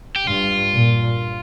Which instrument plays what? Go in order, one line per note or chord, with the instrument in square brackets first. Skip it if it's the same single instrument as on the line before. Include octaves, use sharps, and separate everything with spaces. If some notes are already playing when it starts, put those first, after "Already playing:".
[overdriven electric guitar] G4
[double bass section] G2 [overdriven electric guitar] F4
[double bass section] A#2